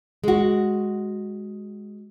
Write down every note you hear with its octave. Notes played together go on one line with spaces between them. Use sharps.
G#3 F#4